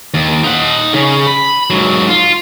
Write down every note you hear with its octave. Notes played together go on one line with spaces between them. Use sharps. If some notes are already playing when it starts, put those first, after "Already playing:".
D#2
D#4 F#5
C#3 C#4
B5
G#2 F#3
F4